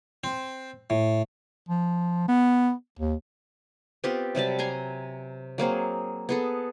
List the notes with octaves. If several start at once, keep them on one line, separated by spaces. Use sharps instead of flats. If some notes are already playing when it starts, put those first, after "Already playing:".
C4
A2
F3
B3
D#2
B3 C4 F4 G4
C3 F#3 G3 A5
G#5 A#5 C6
F#3 A#3 C4 G#4
B3 G#4 A4